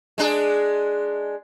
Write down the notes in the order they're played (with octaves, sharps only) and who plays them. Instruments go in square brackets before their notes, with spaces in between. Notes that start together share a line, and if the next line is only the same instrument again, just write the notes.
[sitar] G#3 D4 G#4